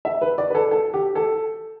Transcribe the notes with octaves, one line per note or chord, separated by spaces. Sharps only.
E5
B4
D5
B4
A4
A4
G4
A4